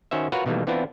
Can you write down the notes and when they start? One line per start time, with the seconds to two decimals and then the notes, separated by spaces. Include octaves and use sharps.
0.11 D#3 C#4 F#4 C5 E5
0.32 F4 F#4 A#4 B4 C#5 F#5
0.46 B2 D#3 E3 G3 A3 A#3
0.67 E3 B3 C4 D4 E4 F4